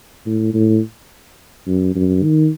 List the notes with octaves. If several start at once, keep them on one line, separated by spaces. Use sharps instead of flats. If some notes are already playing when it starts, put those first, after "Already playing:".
A2
A2
F#2
F#2
D#3